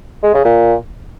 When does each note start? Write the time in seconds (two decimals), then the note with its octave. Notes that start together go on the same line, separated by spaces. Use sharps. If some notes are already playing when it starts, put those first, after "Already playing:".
0.23 G#3
0.34 C#3
0.45 A#2